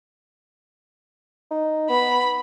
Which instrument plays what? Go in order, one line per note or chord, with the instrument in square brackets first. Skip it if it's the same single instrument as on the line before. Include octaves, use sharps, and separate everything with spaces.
[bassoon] D#4
[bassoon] B3 [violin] B5